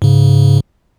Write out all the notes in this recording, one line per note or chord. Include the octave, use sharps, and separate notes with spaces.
G#2 C#3